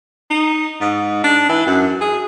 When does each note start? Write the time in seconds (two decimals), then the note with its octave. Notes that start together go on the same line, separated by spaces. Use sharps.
0.30 D#4
0.81 G#2
1.24 D4
1.49 E3
1.67 F#2
2.01 G#4